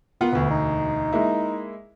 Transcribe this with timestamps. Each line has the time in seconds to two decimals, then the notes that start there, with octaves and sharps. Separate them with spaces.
0.21 A#3 B3 F4 F#5
0.33 E1 D2 B3
0.51 D#4
1.12 G#3 A#3 E4